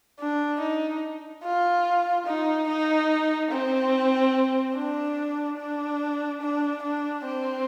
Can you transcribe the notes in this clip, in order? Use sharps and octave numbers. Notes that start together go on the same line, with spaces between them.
D4
D#4
F4
D#4
D#4
C4
D4
D4
D4
D4
C4